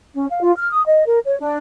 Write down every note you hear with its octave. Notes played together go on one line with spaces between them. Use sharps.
C#4
F5
F4
F6
D#6
D#5
A#4
C#5
D4